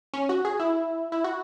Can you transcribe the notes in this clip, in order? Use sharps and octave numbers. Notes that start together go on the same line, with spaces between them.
C#4
F#4
G#4
E4
E4
F#4